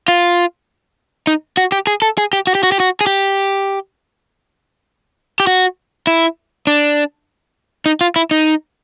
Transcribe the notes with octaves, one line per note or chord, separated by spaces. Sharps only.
F4
D#4
F#4
G4
G#4
A4
G#4
G4
F#4
G4
F#4
G4
F#4
G#4
G4
G4
F#4
E4
D4
D#4
F4
E4
D#4